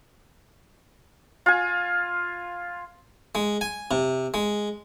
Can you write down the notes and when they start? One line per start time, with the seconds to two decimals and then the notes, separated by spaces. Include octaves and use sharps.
1.46 F4 G#5
3.35 G#3
3.61 G#5
3.91 C3
4.34 G#3